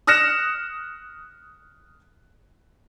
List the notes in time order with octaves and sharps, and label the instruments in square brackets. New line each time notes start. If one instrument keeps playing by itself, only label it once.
[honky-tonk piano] D#6 F6 F#6 A#6 C#7 E7